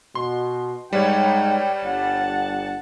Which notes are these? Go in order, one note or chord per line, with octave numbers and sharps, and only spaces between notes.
B2 C6
G#2 G3 B4 C#5 G5
G1 F#5 A5